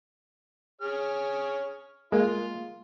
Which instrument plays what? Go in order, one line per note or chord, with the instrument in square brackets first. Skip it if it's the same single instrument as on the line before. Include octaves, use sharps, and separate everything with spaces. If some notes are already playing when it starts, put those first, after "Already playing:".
[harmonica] G#4 C#5 F6
[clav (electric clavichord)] G#3 A#3 [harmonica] F4